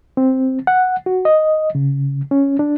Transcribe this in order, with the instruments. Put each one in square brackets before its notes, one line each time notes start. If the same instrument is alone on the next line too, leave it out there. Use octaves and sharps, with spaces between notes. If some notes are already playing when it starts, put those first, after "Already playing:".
[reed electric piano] C4
F#5
F#4
D#5
C#3
C#4
D4